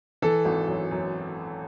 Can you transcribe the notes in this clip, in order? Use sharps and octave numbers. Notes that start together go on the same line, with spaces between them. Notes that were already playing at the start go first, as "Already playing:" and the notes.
E3 A4
G#1
F#2
F#2